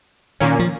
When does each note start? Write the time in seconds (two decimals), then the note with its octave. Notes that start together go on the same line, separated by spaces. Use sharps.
0.40 A#2 D#3 A#3 C#4
0.59 F3